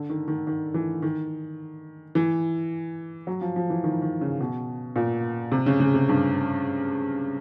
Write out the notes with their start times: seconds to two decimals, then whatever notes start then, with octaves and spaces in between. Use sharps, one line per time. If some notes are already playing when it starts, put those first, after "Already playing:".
Already playing: D3
0.09 D#3
0.28 D#3
0.47 D#3
0.74 E3
1.02 D#3
2.15 E3
3.27 F#3
3.41 F3
3.56 F3
3.70 E3
3.84 D#3
4.02 D#3
4.21 C#3
4.40 B2
4.96 A#2
5.52 C3
5.66 C#3
5.80 C#3
5.94 C3
6.09 G2